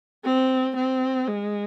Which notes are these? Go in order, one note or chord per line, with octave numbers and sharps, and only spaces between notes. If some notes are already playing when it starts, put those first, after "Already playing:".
C4
C4
G#3